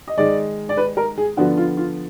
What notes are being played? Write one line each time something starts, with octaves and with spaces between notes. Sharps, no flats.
D#5
D#3 G#3 D#4 D5
D5
B4
A#4
G#4
D3 F3 B3 D4 F#4
F4
F4